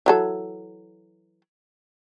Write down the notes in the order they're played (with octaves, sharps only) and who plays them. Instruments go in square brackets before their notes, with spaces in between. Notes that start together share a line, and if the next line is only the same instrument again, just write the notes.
[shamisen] E3 F#3 A4